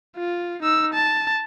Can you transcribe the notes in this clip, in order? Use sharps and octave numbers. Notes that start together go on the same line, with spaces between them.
F4
D#4 E6
A5